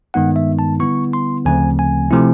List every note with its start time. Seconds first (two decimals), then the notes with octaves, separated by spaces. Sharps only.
0.14 G2 D#3 G#3 B3 D#4 F#5
0.36 E5
0.59 A5
0.80 D3 G3 B3 E4 C#6
1.13 C6
1.45 D2 C#3 F3 A3 C4 G#5
1.79 G#5
2.11 C3 F3 A3 C4 E4